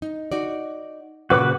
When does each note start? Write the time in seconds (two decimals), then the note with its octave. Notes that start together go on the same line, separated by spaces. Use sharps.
0.02 D#4
0.32 D#4 F#4 D5
1.30 A#2 C#3 F#4 B4 D6